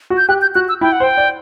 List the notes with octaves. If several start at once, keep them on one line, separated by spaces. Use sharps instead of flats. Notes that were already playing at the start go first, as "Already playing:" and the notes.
F#4
G6
G4 F#6
G6
F#4 F#6
E6
E4 G5
F#5
C5
G5
D5